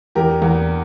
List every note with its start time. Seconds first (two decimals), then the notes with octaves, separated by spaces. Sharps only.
0.15 E2 G4 A#4
0.42 E2